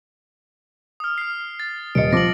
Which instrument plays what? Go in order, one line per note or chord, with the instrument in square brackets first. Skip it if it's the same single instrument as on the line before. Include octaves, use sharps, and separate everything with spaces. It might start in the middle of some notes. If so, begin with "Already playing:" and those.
[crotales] D#6 F6
F6 C7
A6
[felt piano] D#1 D#5 [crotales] C#7 D7
[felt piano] F3 D6 [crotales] A#6 F#7